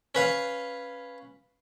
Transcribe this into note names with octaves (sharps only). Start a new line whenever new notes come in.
C#4 B4 F5